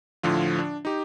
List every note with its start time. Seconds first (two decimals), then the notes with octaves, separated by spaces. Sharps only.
0.23 A2 D3 F3 F4
0.59 D4
0.85 D#4 G4